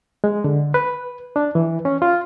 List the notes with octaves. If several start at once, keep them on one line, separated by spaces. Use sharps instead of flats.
G#3
D3
B4
D4
E3
C#4
F4